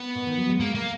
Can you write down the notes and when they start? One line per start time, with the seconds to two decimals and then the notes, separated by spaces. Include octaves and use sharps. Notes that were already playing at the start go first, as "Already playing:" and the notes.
Already playing: B3
0.15 B2
0.26 D#3
0.37 F#3
0.49 G#3
0.60 A#3
0.75 A#3